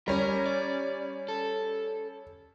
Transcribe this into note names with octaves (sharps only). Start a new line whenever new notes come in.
G3 C#4 A#4
D5
A4